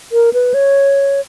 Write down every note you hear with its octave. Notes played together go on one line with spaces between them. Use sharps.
A#4
B4
C#5